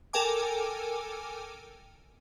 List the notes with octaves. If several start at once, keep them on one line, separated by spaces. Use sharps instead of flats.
A4 A#4 G5 G#5 D6